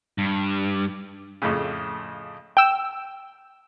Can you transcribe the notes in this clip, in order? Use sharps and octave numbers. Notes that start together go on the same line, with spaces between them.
G2
F2 A2 C#3
G5 E6